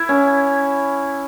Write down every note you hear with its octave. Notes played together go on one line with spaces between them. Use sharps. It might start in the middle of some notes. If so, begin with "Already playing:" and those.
Already playing: E4
C#4